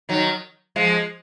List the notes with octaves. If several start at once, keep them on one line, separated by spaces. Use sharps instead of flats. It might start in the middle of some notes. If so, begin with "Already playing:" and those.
D#3 F#3
F3 G#3